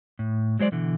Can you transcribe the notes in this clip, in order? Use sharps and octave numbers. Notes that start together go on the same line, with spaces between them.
A2
F#3 G#3 C5 D5
B2 D3 E3